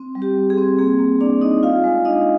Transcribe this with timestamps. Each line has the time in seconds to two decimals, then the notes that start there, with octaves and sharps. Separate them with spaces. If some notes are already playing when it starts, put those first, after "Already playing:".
Already playing: C4
0.15 G3
0.22 G4
0.36 G3
0.50 G#4
0.57 C4
0.79 A#3 G#4
0.99 A#3
1.20 A#3 D4 D5
1.41 D#4 D#5
1.63 F4 F5
1.84 G#3
2.05 D4 D#4 D#5